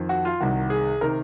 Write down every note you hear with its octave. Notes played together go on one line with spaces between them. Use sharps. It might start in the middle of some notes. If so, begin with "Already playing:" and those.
Already playing: F2 D#3
F#4
F4
C2 C3 D#3 F#4
G#4
C3 D#3 A#4